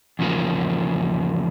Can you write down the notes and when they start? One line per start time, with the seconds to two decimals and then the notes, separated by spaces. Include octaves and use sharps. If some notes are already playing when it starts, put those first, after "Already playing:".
0.19 E2 C#3 F3 A#3